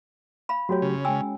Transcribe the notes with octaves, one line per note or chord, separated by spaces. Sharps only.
F5 B5
F#3 A3 F#4 G4 C#5
C#3
G#3 C#4 G5 G#5 E6